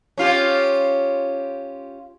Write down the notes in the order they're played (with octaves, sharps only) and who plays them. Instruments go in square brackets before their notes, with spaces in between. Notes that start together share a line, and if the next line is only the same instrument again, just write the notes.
[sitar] C#4 F4 G4